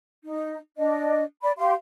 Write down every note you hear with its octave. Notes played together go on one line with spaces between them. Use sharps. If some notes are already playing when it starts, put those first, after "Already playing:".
D#4
D4 D#5
D5 B5
G4 F5 C6